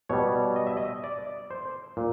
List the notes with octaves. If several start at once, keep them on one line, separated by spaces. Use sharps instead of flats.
B2 G3 C#5
D#5
E5
D#5
D5
C5
A#2